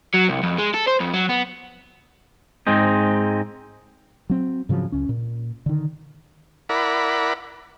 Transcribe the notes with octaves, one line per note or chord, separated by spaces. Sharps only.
F#3
C2
F2
G#3
A4
C5
F2
F#3
B3
G#2 G#3 C4 D#4
F#3 C4
G#2 C#3 F3 F#3
C#2 C#4
A#2
D3 D#3
E4 A#4 D5 F#5 B5